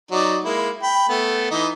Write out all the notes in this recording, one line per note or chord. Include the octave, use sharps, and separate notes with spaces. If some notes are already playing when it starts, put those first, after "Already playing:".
F#3 D#4 D5
G#3 A#3 E4
G5 B5
A3 B3
E3 D#4